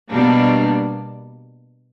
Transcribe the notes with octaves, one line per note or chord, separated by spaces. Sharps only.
B2 G3 A#3 D4